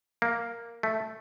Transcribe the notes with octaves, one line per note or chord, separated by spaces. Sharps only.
A#3
A3